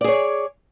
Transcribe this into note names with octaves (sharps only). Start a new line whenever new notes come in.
G#4 C#5 D5